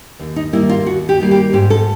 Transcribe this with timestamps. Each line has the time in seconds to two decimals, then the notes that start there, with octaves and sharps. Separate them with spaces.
0.19 D#2
0.36 D#4
0.53 D#3 G3 A#3 E4
0.69 F4
0.86 D#2 F#4
1.09 G4
1.20 D#3 G3 A#3
1.31 G4
1.53 G#2 G4
1.70 A4